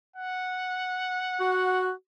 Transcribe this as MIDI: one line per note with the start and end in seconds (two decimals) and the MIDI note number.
0.16 1.89 78
1.40 1.92 66